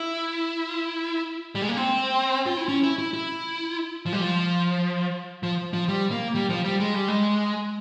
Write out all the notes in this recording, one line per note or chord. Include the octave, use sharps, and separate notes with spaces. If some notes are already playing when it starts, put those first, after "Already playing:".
Already playing: E4
G3
G#3
A#3
C4
F4
E4
C#4
E4
E4
E4
F3
G3
F3
F3
F3
G3
A#3
G3
F3
G3
G#3
G3
G#3